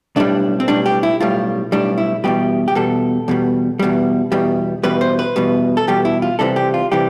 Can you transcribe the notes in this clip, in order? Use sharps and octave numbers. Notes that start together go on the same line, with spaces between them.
B1 A2 G3 D4
C4
B1 A2 G3 D4
G4
E4
B1 A2 G3 F4
B1 A2 G3 D4
E4
E2 B2 G3 G4
G4
E2 B2 G3 A4
E2 B2 G3
E2 B2 G3
E2 B2 G3
E2 B2 G3 B4
C5
B4
E2 B2 G3
A4
E2 B2 G3 G4
E4
F4
C2 C3 E3 G3 A4
G4
F4
C3 E3 G3 G4